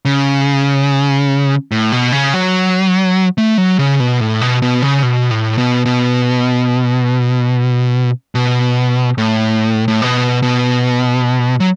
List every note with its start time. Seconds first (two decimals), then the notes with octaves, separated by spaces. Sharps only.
0.05 C#3
1.72 A2
1.92 B2
2.12 C#3
2.34 F#3
3.38 A3
3.58 F#3
3.79 C#3
4.00 B2
4.20 A2
4.41 B2
4.62 B2
4.82 C#3
5.03 B2
5.31 A2
5.58 B2
5.86 B2
8.35 B2
9.18 A2
9.88 A2
10.02 B2
10.43 B2
11.60 F#3